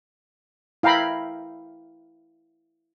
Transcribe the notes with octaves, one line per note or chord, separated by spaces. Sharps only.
E4 F5 G5 A#5 B5